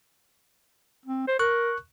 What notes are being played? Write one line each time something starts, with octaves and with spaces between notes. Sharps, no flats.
C4
C5
A#4 C#6 F#6